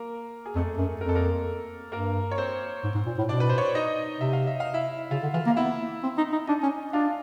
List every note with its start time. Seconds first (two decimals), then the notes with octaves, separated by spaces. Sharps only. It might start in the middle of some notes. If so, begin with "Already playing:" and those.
Already playing: A#3 A#4
0.46 G#4
0.55 F2 A3 A4
0.78 F#2
1.01 F2 A#4
1.09 A4
1.15 A#3 A#4
1.92 G2 A#3 A#4
2.31 C#5
2.38 C4 C5
2.84 G#2
2.95 G#2
3.06 A#2
3.18 A2
3.29 B2 D4 D5
3.40 B4
3.49 C5
3.58 C#5
3.66 D5
3.75 D#4 D#5
4.20 C3 E5
4.33 F5
4.47 E5
4.60 F5
4.74 E4 E5
5.11 C#3 F4 F5
5.23 D3
5.33 E3 F4 F5
5.46 A#3
5.51 F5
5.56 B3 E4 E5
6.03 C4
6.17 D#4
6.32 D#4
6.47 D4 D#4 D#5
6.63 C#4
6.93 D4 F4 F5